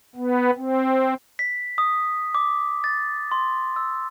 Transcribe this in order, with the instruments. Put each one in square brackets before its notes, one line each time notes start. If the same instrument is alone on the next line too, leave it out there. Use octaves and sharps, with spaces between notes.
[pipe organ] B3
C4
[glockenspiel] B6
D#6
D6
A6
C6
E6